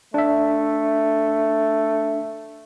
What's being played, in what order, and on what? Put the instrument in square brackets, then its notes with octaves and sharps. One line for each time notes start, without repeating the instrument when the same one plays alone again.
[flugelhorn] A3 [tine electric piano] D4 E5